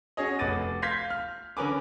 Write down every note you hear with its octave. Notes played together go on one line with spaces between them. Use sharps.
C#4 F#4 G#4 C#5 D#5
F1 B4 F#5 D6 A6 D#7
F5 C6 G6 G#6 B6
F6
D3 C#4 A#4 B4 G#5 D6